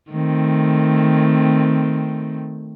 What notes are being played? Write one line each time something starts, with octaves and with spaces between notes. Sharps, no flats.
D#3 A3 C4